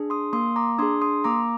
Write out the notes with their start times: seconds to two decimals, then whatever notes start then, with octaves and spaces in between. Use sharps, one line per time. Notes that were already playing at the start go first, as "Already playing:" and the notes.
Already playing: D4 G#4
0.10 C6 D#6
0.33 A#3 C6 D#6
0.56 A#5 D6
0.79 D4 C6 D#6
0.82 G#4
1.02 C6 D#6
1.24 A#3 A#5 D6